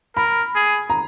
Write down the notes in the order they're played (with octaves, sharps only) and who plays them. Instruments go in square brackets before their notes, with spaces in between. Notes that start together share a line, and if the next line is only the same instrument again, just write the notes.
[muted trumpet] A#4 [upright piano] B5
[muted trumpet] G#4
[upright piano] A#5